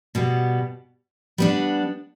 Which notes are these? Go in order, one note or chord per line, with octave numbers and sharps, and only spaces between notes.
B2 G3 B3
G3 B3 D4